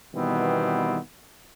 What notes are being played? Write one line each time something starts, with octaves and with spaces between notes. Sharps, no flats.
B2 D#3 E3 G3 B3 C4